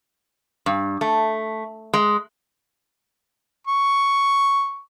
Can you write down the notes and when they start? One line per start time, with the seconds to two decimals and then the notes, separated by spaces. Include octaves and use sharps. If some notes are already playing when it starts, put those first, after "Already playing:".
0.66 G2
1.01 A3
1.94 G#3
3.67 C#6